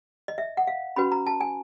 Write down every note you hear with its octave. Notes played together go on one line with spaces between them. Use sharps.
D#5
E5
F#5
F5
C#4 F#4 B4 B5
A#5
A5
G#5